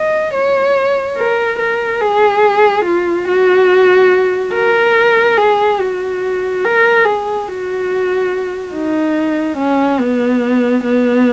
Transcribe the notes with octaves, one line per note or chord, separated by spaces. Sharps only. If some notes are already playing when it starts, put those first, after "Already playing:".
Already playing: D#5
C#5
A#4
A#4
G#4
F4
F#4
A#4
G#4
F#4
A#4
G#4
F#4
D#4
C#4
B3
B3